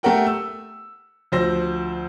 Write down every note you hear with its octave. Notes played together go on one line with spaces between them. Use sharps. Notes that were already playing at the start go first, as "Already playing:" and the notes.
A3 G4 A4 A#4 F#5 G5
E6
D2 F3 C5 E6 A#6